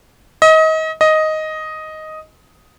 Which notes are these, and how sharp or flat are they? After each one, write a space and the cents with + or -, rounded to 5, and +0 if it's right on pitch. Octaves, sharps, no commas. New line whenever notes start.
D#5 +30
D#5 +5